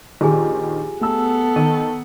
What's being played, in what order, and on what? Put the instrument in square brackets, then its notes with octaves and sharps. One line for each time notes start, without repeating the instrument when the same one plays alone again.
[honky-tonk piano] A#1 D#3 [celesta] G4 G#4 G#5
[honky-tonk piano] A3 E6 [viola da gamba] B3 [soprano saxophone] A4
[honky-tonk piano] D#3 [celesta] D#7